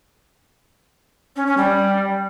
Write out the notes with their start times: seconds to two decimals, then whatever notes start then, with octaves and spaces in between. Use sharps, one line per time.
1.36 C#4
1.46 C#4
1.57 G3